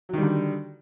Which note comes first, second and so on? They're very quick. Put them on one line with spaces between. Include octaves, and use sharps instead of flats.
F#3 D#3 G3 D3